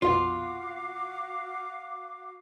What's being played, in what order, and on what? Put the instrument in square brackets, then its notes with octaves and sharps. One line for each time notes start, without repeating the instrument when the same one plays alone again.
[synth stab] A#1 F2 B2 [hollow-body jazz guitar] F4 [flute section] F#4 F5 D6